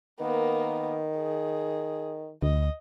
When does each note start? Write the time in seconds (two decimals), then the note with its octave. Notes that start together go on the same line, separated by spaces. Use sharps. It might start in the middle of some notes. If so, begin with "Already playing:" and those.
0.21 D#3 A#3 B3
1.18 G#4
2.42 D2 D#5